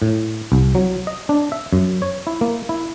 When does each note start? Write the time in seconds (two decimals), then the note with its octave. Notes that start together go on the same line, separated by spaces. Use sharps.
0.02 A2
0.52 C2
0.75 F#3
1.07 D#5
1.29 D4
1.52 E5
1.73 F#2
2.02 C#5
2.27 E4
2.41 A#3
2.69 E4